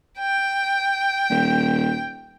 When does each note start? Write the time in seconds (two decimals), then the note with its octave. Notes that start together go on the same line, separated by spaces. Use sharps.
0.19 G5
1.30 D#1